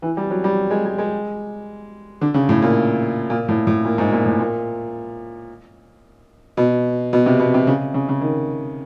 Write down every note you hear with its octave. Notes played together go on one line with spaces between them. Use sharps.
E3
G3
F#3
G3
G#3
G#3
G#3
D3
C#3
A2
A#2
A#2
A2
A2
A#2
G#2
A#2
A2
A#2
B2
B2
C3
B2
C3
C#3
C#3
C#3
D#3